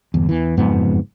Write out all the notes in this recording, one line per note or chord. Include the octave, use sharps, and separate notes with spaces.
G1 E2
E2 E3
F#1 F2 G#2 B3